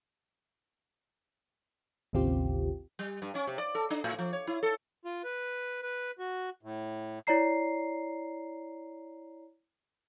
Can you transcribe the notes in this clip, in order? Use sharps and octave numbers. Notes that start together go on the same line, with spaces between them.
A1 D#2 C#3 C4 F4 G4
G3
G2
C#4
C3
D5
A4
D4
A2
F3
C#5
E4
A4
F4
B4
B4
F#4
A2
E4 C#5 D5 A#5 C7